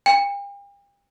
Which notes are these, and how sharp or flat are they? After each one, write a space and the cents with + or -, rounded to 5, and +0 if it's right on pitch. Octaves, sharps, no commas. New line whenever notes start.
G5 +45